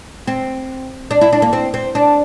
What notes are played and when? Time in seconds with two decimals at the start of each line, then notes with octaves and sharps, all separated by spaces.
0.27 C4
1.11 D4
1.21 E4
1.33 D4
1.42 A#3
1.53 C4
1.74 C4
1.95 D4